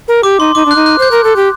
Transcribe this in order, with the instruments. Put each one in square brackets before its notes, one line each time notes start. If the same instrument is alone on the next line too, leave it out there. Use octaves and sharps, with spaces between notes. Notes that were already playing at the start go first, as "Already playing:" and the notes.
[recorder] A#4
[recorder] G4 [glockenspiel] D6
[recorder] D#4 [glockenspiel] C6
[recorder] D#4 [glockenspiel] D6
[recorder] D4
[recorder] D#4 [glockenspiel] F#6
[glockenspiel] F#6
[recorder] C5 [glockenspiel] G6
[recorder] A#4
A4
G4